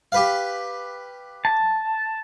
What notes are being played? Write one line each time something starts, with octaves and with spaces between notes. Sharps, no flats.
G4 B4 F5
A5